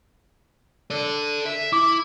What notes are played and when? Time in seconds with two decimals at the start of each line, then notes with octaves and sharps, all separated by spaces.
0.90 A4 D5
1.46 E5
1.73 E4 D6